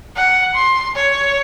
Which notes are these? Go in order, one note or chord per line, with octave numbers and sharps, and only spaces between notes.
F#5
C6
C#5